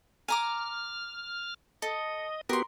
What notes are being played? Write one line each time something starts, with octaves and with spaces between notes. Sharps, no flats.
G#5 A#5 D6 F6
A4 D#5
B3 F#4 G4 A#4 C6